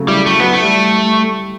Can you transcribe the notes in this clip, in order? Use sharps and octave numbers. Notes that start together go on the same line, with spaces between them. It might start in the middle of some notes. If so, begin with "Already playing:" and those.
Already playing: C#3 F#3 A3
G3 E4
F#3 A3
B3 E4
A3
G3